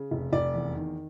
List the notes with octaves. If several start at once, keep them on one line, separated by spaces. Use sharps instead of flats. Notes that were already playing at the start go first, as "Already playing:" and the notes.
Already playing: C#3
F1
F1 D5
E2
D#3